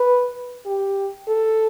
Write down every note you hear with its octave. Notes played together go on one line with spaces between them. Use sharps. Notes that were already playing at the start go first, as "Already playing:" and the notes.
Already playing: B4
G4
A4